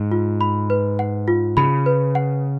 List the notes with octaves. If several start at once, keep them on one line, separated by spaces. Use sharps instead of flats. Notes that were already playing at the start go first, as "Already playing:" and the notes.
Already playing: G#2
F4
B5
B4
F#5
F4
C#3 B5
B4
F#5